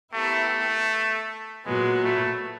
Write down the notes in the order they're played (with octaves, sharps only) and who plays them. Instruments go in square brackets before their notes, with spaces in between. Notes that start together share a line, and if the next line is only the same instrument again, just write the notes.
[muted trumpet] A3 [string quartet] B3 E4 G4 A#4
[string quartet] A#2 F#3 B3 [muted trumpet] G#3
[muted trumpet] A3